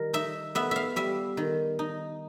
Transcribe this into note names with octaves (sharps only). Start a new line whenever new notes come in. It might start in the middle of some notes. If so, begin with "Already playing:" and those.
Already playing: D#3 G3 A#4
D#4 E5
B3 E5
E5 F5
G3 E5
D#3
D#4